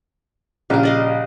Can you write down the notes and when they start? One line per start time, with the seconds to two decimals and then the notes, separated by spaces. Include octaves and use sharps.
0.70 A#1 C#3 G4 A#4
0.83 D5 D#5 F5